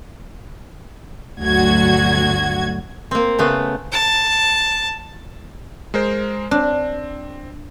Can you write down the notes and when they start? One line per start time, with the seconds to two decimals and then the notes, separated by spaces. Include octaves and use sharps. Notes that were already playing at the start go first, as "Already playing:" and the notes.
1.43 G1 D2 F#3 F#4 G#6
3.11 A#3 C4
3.39 C#3 A3 B3
3.92 A5
5.94 G#3 A#4 C5
6.51 C4 D4